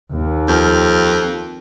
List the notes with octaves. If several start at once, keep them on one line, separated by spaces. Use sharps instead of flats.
D#2
F2